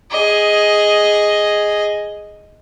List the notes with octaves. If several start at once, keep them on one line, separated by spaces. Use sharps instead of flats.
G#4 D#5